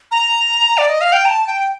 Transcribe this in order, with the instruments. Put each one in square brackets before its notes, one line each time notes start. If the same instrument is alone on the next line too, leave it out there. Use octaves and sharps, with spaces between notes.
[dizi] A#5
D5
D#5
F5
G5
A#5
A5
G5